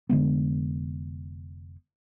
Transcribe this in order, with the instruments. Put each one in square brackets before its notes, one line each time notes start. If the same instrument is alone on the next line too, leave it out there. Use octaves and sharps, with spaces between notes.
[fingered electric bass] F1 D3 G#3 B3